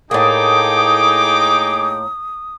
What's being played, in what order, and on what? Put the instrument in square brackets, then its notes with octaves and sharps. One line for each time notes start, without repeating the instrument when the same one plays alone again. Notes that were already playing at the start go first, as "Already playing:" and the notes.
[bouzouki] A2 A#3 [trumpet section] D#4 G5 D6 [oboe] G#4 [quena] D#6